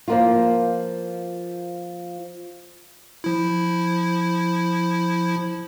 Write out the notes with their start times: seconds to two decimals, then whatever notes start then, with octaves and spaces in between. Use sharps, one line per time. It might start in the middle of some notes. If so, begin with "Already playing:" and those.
0.08 F3 A#3 F4
3.24 F3 E4